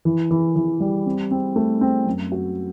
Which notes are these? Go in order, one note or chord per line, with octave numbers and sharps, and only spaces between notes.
E3
E3
E3
G3
C4
C4
A3
C4
F#2
F#4